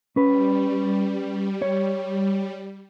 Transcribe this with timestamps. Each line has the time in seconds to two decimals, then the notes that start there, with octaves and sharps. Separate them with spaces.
0.16 G3 C#4 B4
1.62 C#5